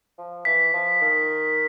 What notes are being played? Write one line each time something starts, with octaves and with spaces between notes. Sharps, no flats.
F3
E3 B6
F3
D#3